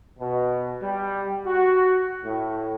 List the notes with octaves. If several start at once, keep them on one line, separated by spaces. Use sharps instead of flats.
B2
G3
F#4
A2